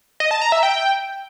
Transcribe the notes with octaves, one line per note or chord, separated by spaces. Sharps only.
D#5
A5
A#5
E5
G5